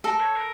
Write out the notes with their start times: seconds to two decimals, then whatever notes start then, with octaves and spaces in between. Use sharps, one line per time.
0.04 A4 A#4
0.20 C#5
0.36 A#4